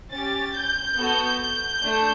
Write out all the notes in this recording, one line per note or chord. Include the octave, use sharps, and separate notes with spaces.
C#4 G4 A6
G6
B3 F#4 A4 G6
A3 D4